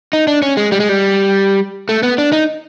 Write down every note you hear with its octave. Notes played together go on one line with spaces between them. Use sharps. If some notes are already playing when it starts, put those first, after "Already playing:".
D#4
D4
C#4
G#3
G3
G#3
G3
A3
B3
D4
D#4